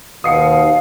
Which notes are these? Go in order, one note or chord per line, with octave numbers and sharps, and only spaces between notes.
D#2 B2 F5 D#6 C7 C#7